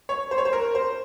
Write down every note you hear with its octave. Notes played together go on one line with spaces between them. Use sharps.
C#5
C5
C#5
C5
A#4
C5